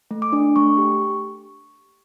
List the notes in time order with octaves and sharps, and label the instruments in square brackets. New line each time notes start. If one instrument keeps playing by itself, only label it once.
[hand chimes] A3
D6
D4
A3 C#6
G4